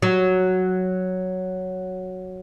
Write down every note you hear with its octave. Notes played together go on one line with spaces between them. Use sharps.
F#3